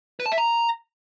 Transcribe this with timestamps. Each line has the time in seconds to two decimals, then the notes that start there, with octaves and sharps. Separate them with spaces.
0.20 B4
0.26 A5
0.32 E5
0.38 A#5